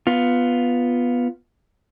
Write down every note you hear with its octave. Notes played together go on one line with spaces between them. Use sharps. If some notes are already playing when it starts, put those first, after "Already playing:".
B3 F4